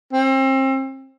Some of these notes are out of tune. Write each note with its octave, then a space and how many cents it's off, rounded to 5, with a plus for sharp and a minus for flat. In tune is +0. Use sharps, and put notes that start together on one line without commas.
C4 +35